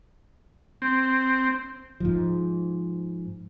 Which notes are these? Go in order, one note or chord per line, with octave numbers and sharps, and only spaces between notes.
C4
G#2 F3